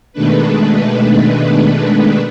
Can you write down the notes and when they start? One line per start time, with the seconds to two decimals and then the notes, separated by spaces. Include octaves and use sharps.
0.13 B2 D#3 G#3 A3 D4 B4